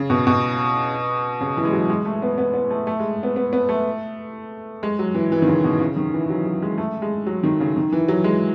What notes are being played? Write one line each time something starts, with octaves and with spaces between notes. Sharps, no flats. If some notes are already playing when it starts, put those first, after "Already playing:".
Already playing: C#3
B2
B2
C#3
E3
G#3
F#3
G#3
A3
B3
B3
B3
A3
A3
G#3
B3
B3
B3
A3
G#3
F#3
E3
E3
D#3
C#3
B2
C#3
D#3
E3
F#3
F#3
G#3
A3
G#3
F#3
D#3
C#3
D#3
E3
F#3
G#3